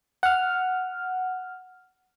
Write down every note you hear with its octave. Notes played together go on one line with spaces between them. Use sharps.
F#5 F6